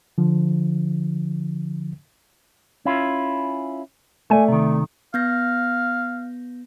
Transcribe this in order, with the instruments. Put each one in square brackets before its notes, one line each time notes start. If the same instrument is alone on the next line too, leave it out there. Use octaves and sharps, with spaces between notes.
[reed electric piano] D3 F3
[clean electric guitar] C#4 E4 F4
[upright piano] A3 D5 [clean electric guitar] G#5
[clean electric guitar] C3 D#3
[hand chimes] B3 G6 A#6 [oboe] F5